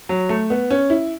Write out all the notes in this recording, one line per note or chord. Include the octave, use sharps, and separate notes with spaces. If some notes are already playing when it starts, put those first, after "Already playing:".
F#3
A3
B3
C#4
E4